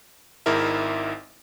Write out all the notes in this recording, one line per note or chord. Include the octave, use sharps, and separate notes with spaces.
G#1 G#2 D#4 E4 A#4 E5